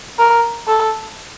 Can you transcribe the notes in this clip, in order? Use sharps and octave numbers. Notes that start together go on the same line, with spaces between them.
A#4
A4